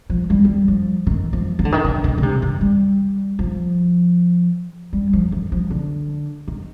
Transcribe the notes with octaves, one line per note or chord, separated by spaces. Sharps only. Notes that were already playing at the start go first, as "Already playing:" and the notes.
F3
G3
G3
F3
D#3
F3
D#3
D3
D#3
D3
D3
D3
C3
D#3
G3
F3
G3
F3
D#3
F3
D3
D#3